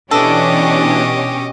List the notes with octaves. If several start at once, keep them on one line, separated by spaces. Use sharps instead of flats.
B2 E3 C#4 D4 G4 A4 D#5 D6